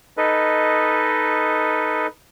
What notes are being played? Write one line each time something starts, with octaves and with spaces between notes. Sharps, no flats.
D#4 A4 B4 D#5